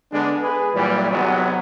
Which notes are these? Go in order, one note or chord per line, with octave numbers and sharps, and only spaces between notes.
D3 G#3 B3 D4
G#4 B4
A#2 E3 F#3 G3
G#1 C3 F#3 G#3 B3 F#4